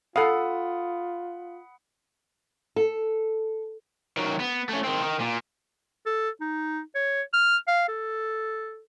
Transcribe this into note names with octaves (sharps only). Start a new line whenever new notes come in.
F4 A4 F5 F#5 B5 D#6
A4
D#3 F#3
B3
A3 C#4
D#3 C4
D#3
A#2
A4
D#4
C#5
F6
F5
A4